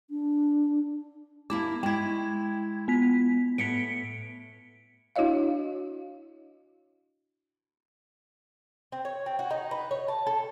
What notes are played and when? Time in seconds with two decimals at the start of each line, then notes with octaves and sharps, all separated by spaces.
0.10 D4
1.50 A#3 E4 A5 D6
1.83 G#3 E4 G5 G#6
2.88 B3 B6
3.58 A2 B3 B6 C#7 D7
5.16 D4 E4 F#4 C#5 D#5 F5
8.92 C4
9.05 C#5
9.26 C4
9.39 F#4
9.51 D#4
9.71 B4
9.91 C#5
10.08 A5
10.27 A4